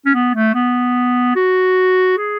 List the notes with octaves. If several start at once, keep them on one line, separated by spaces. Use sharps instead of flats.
C#4
B3
A3
B3
F#4
G#4